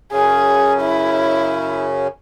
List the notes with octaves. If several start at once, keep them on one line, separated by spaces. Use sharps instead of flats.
F#2 C#3 C#4 G#4
E4